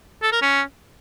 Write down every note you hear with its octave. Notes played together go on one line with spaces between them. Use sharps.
A4
A#4
C#4